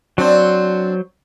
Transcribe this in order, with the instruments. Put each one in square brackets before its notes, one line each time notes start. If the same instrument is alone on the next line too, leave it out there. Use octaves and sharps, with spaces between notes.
[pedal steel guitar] F#3 C5 [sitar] C4 D4